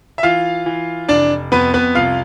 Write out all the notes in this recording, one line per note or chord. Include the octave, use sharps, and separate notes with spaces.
E5
E3 F4 F5
E3
F1 D4 D5
F2 B3 B4
B3 B4
C2 F4 F5